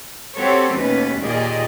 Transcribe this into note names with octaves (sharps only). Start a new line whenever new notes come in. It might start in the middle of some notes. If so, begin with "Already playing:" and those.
C4 F#4 G4 A4 C#5
D#2 B2 A3 C#4 B4
D#2 A#2 G4 G#4 D5 D#5